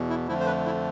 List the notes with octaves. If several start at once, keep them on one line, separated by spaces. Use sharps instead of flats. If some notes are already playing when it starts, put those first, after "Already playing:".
Already playing: E2 B2
E4
F2 D3 F3 A3 E4
C5
B4
E4